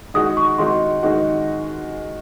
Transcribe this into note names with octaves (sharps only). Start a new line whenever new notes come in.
D#3 G#3 D#4 F#4 D#6
C#6
D#3 G#3 D#4 F#4 C6
D#3 G#3 D#4 F#4